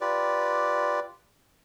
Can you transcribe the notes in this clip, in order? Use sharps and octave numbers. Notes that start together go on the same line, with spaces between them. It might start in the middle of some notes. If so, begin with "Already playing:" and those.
F4 G4 B4 D5